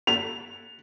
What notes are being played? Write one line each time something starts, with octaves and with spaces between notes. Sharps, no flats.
F7